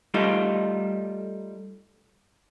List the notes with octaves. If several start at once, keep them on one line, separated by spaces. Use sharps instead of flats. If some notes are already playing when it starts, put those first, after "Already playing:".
G3 A3 D#4 F4